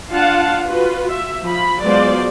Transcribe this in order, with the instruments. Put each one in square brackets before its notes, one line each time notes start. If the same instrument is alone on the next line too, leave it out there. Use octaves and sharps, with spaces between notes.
[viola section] D4 F4 F5 F#5 A5
F4 F#4 B4
E5
F3 B5
F#3 G#3 B3 F4 C5 D5